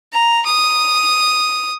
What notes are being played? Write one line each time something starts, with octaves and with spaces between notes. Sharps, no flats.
A#5
D#6